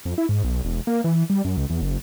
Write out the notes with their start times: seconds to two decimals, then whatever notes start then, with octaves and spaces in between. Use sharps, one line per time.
0.05 F2
0.18 E4
0.29 G#2
0.44 B1
0.64 E1
0.87 A#3
1.04 E3
1.30 G3
1.45 F#2
1.57 C#2
1.70 E2
1.82 F#1